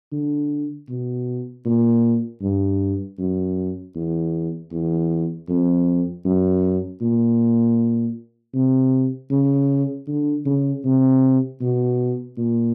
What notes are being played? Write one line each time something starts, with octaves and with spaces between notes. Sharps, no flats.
D3
B2
A#2
G2
F#2
E2
E2
F2
F#2
A#2
C3
C#3
D3
C#3
C3
B2
A#2